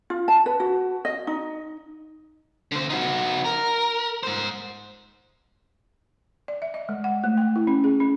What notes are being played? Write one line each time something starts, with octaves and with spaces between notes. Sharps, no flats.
F4
A5
B4
F#4
D#5
D#4
D3 C5
D#4 F#4
A#4
G#2 C5
D5
E5
D#5
G#3
F#5
A3
G5
E4
C#4
G#4
C#4